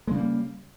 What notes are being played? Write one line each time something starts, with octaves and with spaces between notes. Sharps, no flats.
C#3 G3 G#3 A#3